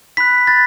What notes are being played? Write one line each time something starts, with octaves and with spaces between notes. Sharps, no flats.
B5 F#6 B6
B5 F#6 A6